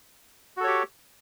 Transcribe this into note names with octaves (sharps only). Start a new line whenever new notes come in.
F#4 G4 A4 C#5